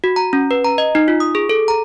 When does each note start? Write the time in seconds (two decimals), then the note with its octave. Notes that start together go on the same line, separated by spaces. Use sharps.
0.04 F#4
0.16 A#5
0.33 C#4
0.51 B4
0.64 A#5
0.78 D#5
0.95 D#4
1.08 F4
1.20 D#6
1.35 G#4
1.49 A4
1.68 A#5